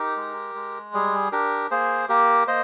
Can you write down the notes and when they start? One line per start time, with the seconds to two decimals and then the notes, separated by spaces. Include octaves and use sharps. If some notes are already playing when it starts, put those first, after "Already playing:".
Already playing: D#4 G4 A#4
0.16 G#3
0.55 G#3
0.93 G3 G#4
1.32 D4 G4 A#4
1.71 A#3 G#4 C5
2.09 A#3 G4 A#4
2.47 A#3 C5 D#5